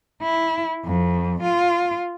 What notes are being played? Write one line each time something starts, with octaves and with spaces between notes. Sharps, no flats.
E4
F2
F4